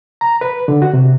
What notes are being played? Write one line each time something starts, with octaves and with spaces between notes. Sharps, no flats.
A#5
B4
D3
F#4
C3